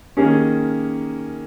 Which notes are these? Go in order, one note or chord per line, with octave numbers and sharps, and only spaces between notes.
D#3 A#3 C#4 G#4